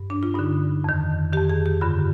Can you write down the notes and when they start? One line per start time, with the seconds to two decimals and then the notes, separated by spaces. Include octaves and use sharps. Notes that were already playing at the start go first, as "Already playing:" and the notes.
Already playing: G2
0.10 D4
0.23 F4
0.34 G2 D3 D#4
0.84 F2 D#3
1.33 F2 D#3 G4
1.50 G#4
1.66 G4
1.81 G2 D3 F4